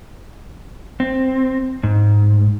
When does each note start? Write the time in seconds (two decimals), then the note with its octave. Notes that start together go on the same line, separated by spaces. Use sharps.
1.00 C4
1.83 G#2